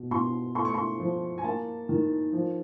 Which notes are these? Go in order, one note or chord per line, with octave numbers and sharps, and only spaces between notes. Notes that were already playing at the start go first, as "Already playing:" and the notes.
Already playing: B2
B2 C6
A3 C6
C#6
C6
F3
G#5
A#3 A5
D#3
F3